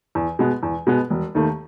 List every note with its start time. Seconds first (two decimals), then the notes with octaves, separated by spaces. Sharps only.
0.15 E2
0.39 B2 G#3 B3
0.63 E2
0.87 B2 G#3 B3
1.10 E1
1.35 D#2 D#3 A3